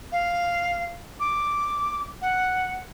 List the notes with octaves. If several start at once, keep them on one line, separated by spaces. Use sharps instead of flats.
F5
D6
F#5